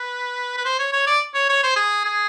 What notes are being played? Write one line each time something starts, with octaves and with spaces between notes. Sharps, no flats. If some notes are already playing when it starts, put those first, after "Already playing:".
Already playing: B4
B4
C5
C#5
C#5
D5
C#5
C#5
C5
G#4
G#4